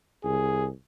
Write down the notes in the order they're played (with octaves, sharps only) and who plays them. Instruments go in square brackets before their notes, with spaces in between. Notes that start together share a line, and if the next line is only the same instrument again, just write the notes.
[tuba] C2 [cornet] G#4